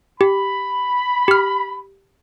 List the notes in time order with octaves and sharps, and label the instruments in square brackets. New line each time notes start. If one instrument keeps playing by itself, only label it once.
[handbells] G4 [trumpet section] B5
[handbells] G4 F6